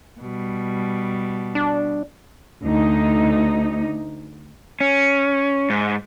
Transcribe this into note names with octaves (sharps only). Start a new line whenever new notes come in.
B2 G3
D4
D2 D#4
C#4
G#2